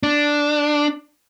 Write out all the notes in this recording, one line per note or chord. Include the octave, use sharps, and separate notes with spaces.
D4